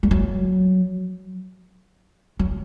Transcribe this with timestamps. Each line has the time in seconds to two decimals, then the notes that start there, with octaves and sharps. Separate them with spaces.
0.03 G3
0.11 F#3
2.39 F#3